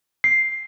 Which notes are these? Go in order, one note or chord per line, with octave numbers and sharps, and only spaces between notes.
C7